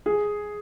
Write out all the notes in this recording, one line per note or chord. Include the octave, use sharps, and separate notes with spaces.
G#4